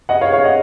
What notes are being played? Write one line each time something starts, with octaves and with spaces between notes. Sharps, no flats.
D#5 F#5
C#5 F5
C#5 F5
D#5 F#5